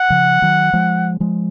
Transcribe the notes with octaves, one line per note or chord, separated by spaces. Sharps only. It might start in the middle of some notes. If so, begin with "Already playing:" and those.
Already playing: F#5
C#3 F3
D#3 F#3
F3 G#3
F3 G#3